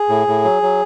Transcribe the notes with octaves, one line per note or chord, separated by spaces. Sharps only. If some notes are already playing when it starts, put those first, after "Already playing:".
Already playing: G#4
A2
A2
F#3
F#3